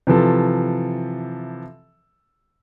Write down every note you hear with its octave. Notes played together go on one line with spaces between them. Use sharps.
C3 E3 F3 A4